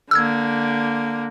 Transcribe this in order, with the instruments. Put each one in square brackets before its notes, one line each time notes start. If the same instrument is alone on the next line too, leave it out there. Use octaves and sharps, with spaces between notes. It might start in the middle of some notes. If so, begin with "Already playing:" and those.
[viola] D3 A#3 [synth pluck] E6 F6 G#6